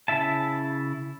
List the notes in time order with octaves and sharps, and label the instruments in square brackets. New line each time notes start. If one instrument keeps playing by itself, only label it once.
[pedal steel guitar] C#3 E4 E5 A5